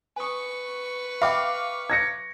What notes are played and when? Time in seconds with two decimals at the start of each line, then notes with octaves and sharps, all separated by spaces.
0.16 B4 G#5 C#6 D#6
1.22 E5 F5 G5 B5 D6
1.90 G#6 A#6 C#7